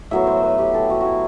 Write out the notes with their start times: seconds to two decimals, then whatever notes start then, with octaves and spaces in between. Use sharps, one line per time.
0.11 A2 F#3 B3 E5
0.27 C5
0.43 B4
0.59 G4
0.74 A4
0.90 F#4
1.01 E4 F#4